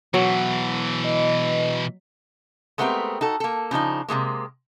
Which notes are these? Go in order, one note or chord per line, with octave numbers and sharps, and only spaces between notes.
B2 E3 F#3
D#5
G#3 A3 B3 C4 G4 A#4
D#4 F#4 A4
A#3 A4
C#3 F3 D4 D#4
C3 E3 G#3 A#3